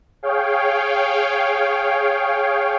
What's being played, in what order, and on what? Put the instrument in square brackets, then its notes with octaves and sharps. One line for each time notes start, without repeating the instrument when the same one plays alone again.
[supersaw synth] G#4 C#5 F5 G5